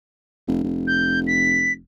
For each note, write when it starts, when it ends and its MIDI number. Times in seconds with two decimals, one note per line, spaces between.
0.47 0.61 29
0.64 1.80 29
0.87 1.19 91
1.27 1.72 95